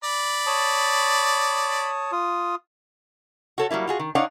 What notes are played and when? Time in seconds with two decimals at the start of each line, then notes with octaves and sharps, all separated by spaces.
0.04 D5 B5
0.47 C#5 A5 D#6
2.12 F4 D#6
3.58 F#4 A4 C#5
3.71 F#3 G3 A#3 E4
3.87 F4 F#4 G#4
3.99 D#3
4.15 D4 D#4 C#5 D5 F5 F#5